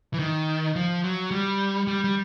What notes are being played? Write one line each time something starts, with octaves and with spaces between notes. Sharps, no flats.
E3
D#3
F3
F#3
G3
G3
G3